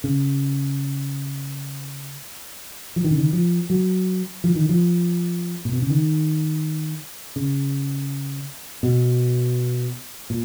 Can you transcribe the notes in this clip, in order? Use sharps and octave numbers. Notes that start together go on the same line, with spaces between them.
C#3
F3
D#3
C#3
D#3
F3
F#3
F3
D#3
F3
A#2
B2
C#3
D#3
C#3
B2
A#2